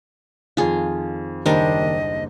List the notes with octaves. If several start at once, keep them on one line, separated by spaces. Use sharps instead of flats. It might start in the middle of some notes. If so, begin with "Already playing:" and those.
F2 D#3 F4 G#4
F#1 D#2 D#3 G3 D4 A#4 C5 D#5